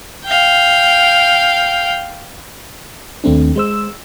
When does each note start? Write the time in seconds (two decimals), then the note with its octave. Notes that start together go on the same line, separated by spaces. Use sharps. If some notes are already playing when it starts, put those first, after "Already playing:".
0.25 F5 G5
3.24 D#2 A3 C4 D4
3.56 G#3 C5 E6